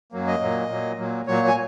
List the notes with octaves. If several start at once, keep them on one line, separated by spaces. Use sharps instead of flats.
F#2 F#3 A#3
D#5
A#2 F#3 A#3
A#2 F#3 A#3
A#2 F#3 A#3
A#2 F#3 A#3 C#5
G#5